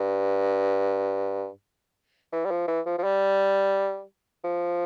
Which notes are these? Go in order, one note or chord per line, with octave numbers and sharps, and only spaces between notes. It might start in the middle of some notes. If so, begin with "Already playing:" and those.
Already playing: G2
E3
G3
F3
E3
F3
F3
G3
F3